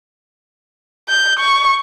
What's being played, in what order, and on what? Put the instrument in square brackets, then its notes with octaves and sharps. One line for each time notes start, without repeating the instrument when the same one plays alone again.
[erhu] G6
C#6